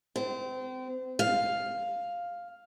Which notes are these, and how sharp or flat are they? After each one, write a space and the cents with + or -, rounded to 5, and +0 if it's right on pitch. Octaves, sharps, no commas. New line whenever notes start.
C4 -30
F5 +5